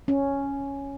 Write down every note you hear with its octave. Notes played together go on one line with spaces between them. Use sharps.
C#4